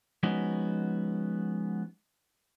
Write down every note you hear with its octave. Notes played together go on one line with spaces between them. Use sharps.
F3 G#3 B3 C#4 D#4 F#4